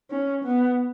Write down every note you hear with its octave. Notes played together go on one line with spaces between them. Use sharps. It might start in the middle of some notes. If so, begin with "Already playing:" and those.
C#4
B3